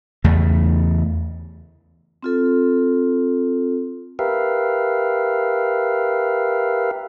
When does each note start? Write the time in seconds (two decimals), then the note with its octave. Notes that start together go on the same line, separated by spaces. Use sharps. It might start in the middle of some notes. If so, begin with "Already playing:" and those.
0.24 E2 C#3 A3
2.23 C4 F4 A4
4.19 G4 A#4 B4 E5 F5